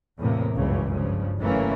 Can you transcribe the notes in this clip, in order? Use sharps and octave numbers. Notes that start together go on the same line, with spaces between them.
E2 A2 C3 A#3
F#1 C#2 G2 C#3 E3
G2 C#3 F3
F#1 E3 A3 A#3 C#4